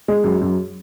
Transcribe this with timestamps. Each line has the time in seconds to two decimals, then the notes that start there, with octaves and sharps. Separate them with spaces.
0.08 G#3
0.24 F#2
0.42 F#2